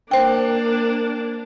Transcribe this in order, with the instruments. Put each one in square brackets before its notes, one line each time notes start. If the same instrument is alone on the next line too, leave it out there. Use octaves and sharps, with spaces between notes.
[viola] A#3 D4 [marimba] C5 G5